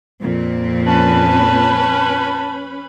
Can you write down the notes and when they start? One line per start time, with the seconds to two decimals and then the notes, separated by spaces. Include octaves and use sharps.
0.22 F2 A#2 C4
0.86 C#4 B4 A5 B5